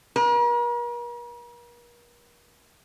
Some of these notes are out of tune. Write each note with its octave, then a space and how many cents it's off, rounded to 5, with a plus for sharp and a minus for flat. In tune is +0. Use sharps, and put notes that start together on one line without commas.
A#4 +45